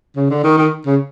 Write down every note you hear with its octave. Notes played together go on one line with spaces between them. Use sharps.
C#3
D3
D#3
D#3
C#3